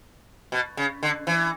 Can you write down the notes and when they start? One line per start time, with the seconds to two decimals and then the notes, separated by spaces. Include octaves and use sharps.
0.52 B2
0.77 C#3
1.03 D3
1.27 E3